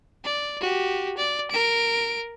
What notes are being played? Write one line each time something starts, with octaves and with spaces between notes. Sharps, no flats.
D5
F#4 G4
D5
A#4 D7